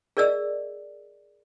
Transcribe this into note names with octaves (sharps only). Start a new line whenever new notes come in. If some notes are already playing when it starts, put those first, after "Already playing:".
G#4 A#4 D5 D#5 E6